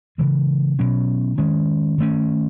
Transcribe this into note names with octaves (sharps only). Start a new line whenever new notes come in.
C#3 E3 G#3
B2 F#3 C#4
D#3 G#3 C#4
D#3 A3 C#4